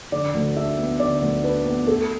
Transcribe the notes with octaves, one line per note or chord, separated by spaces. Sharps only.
D3 D5
D2
D4 E5
B3
D3 D5
D2
D4 B4
B3
A3 A4